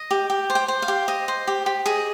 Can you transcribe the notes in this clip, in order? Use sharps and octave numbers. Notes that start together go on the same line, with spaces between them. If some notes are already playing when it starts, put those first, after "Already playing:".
Already playing: D#5
G4
G4
C5
G5
C5
F5
G4
D#5
C5
G4
G4
G#4 D#5